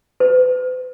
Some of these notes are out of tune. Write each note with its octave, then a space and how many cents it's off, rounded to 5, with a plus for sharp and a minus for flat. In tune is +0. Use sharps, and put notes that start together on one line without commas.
B4 +40